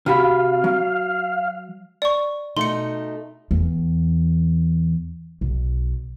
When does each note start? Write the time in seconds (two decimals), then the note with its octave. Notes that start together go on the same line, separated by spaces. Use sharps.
0.06 C3 F#4 F5 B5
0.64 F#3
2.02 D5 C#6
2.57 B2 A3 D#4 C6 C#7
3.51 E2
5.41 B1